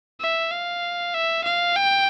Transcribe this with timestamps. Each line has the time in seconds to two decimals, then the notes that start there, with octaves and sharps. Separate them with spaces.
0.21 E5
0.52 F5
1.14 E5
1.44 F5
1.76 G5